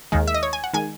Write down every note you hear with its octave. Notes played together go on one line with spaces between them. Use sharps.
D#2 D#3 G#3
E5
D#5
C#5
G#5
F#5
D#3 G#3 G#5